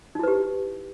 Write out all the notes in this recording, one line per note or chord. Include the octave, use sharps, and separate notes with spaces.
D#4 E4 G4 B4